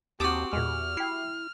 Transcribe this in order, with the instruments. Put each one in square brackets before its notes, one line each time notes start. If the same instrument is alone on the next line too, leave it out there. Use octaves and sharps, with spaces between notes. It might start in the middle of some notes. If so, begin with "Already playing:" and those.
[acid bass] D#2 [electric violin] C4 [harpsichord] F#4 G4 [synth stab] A5 D6 D#6
[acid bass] E2 [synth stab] A#2 G#3 [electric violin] F6
[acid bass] E4 [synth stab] G5 C7